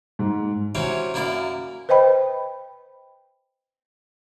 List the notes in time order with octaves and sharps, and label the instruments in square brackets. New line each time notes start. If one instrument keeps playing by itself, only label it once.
[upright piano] G#2
[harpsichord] C3 E3 F#3 C4 C#4
F#2 A#3 E4 D5
[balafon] B4 C5 D#5 G5 B5